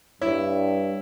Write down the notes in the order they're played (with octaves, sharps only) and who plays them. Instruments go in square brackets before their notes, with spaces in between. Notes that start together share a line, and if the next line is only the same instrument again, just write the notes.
[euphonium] G2 [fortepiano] E4 [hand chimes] C#5